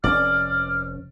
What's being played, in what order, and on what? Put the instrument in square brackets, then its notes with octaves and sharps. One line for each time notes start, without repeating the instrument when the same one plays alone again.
[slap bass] F1 A#2 C#4 [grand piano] D5 [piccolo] F6